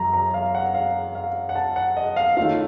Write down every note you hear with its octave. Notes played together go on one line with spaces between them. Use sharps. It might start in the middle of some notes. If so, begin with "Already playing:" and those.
Already playing: F#2 F#3 A#5
A#5
F5
F#5
F5
F5
F#5
A5
F#5
D#5
F5
D#3 A3 C#4 F4 F5